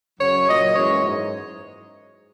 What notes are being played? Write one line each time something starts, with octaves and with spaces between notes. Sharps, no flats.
F#2 C#3 F#3 C#5
A#2 F#3 D#5
F#2 E3 G#3 C#5
G#2